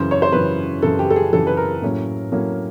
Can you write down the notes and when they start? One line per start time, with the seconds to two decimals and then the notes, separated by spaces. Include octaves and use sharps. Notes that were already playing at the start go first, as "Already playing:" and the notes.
Already playing: F#2 C#3 E3 C5
0.11 C#5
0.22 C5
0.32 F#2 C#3 E3 B4
0.82 F#2 C#3 E3 A4
0.99 G4
1.10 A4
1.16 G#4
1.32 F#2 C#3 E3 A4
1.47 B4
1.57 A#4
1.82 A2 F#3 A#3 C#4
2.32 A2 F#3 A#3 C#4